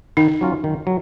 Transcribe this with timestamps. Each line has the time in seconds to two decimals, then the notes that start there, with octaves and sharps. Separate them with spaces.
0.17 D#3 D#4
0.41 F#3 C#4 F4
0.64 D#3
0.87 F#3